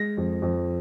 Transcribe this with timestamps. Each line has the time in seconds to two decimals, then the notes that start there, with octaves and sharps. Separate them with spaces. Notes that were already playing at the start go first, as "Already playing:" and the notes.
Already playing: G#3 A#6
0.17 F2
0.42 F2